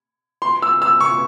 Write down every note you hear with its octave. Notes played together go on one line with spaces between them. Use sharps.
C6
E6
E6
C#6